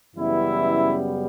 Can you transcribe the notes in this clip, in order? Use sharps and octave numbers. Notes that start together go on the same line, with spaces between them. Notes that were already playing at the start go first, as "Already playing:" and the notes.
F#2 C#3 E3 G3 B3 E4